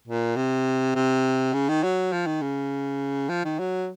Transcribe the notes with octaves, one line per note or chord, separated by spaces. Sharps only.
A#2
C3
C3
C#3
D#3
F#3
F3
D#3
C#3
F3
D#3
F#3